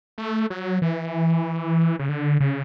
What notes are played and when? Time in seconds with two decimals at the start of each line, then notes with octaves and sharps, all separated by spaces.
0.18 A3
0.50 F#3
0.82 E3
1.99 C#3
2.09 D3
2.40 C#3